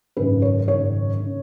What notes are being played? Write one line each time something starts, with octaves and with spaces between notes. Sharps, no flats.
G#1 F#2 C#3 B4
C#5
G#1 F#2 C#3 C#5
C#3